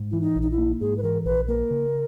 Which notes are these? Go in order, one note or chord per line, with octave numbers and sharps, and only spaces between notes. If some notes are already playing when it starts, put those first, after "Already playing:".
Already playing: G#2
E3 E4
D#4
A#1
D#4
E4
A#3
G#2 G#4
B4
E3 A#4
A#1 B4
A#3 A#4
C#3